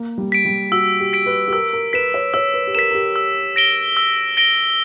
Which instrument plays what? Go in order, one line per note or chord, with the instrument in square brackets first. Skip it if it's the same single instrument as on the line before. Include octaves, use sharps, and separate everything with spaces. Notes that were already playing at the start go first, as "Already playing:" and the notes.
Already playing: [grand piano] A#3
G3
[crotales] B6 D7
[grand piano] G3
[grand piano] F#4 [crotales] E6
[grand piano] G4
[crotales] B6 D7
[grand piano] B4
G4
[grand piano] A#4 [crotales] E6
[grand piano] A#4
[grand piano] B4 [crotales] B6 E7
[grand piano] C#5
[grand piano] C#5 [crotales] E6
[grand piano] B4
G4
[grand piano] A#4 [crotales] B6 E7
[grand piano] A#4
G4
[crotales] E6
A#6 D7 G7
E6
A#6 D7 G7